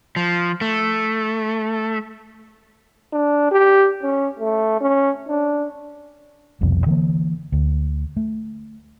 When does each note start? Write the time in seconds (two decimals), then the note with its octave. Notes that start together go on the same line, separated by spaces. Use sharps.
0.16 F3
0.61 A3
3.13 D4
3.51 G4
4.03 C#4
4.39 A3
4.81 C#4
5.28 D4
6.61 F1 C2 F2 B2
6.86 D3 E3 A#3
7.52 D2
8.17 A3